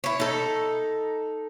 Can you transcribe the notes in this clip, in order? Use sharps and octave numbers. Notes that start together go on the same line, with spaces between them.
E4 C#5
D#4 A4